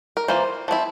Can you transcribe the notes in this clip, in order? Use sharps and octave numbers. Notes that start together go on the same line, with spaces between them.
A#4
E3 A#3 F4 C5
F3 C4 E4